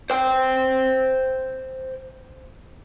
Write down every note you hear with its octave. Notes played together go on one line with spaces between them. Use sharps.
C5 G5